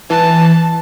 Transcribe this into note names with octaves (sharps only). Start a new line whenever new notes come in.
E3 A5